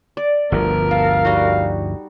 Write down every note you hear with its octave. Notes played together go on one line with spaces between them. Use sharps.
D5
G1 D2 F3 B3 A#4
A4 F5
G3 D#4 F#4